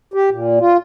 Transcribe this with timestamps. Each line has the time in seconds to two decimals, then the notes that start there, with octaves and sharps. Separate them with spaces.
0.14 G4
0.31 A#2
0.60 F4